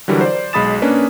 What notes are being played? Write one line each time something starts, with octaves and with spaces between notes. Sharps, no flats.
D3 E3 F#3 G3 F#4 A#4
C5 D5
B1 G#3 B5 D#6 A6 E7
A#3 C#4 D4 B4